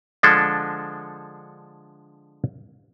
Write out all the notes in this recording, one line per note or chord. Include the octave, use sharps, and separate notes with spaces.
D3 F3 G#3 D4 A4